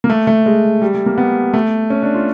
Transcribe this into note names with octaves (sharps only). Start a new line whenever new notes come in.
A#3
A3
A3
G#3
G3
A3
A#3
B3
A3
C#4
D4
F4